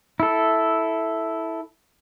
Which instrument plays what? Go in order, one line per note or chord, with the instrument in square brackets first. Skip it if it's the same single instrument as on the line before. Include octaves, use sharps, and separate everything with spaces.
[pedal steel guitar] E4 A4